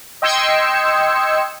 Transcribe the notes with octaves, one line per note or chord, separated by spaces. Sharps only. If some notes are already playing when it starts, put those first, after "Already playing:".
D#5 G5 C6 E6 G#6 C#7